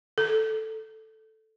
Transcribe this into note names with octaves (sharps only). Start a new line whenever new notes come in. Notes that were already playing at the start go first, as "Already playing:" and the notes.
A4